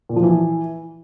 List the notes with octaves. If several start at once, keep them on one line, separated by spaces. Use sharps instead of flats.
A#2
F3
E3